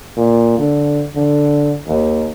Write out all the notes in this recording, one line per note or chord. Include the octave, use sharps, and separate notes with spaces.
A#2
D3
D3
D#2